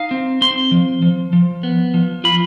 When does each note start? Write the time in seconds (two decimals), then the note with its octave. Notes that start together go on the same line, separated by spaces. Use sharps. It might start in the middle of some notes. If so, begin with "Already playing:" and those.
Already playing: D#4 F5
0.11 C4
0.41 C4 C6
0.71 F3
1.02 F3
1.33 F3
1.63 B3
1.94 F3
2.24 F4 B5